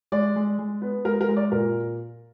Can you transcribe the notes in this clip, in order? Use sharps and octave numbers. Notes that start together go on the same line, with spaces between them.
G#3 D5
G#3
G#3
B3
G#3 A#4
A#4
G#3
D5
A#2 A#4